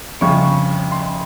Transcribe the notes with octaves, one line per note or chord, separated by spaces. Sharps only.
G1 F2 C#3 C#6
C6